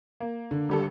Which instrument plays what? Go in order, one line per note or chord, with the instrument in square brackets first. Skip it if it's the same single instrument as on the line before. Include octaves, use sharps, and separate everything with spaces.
[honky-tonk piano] A#3
[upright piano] D3
[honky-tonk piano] G#1 G3 A4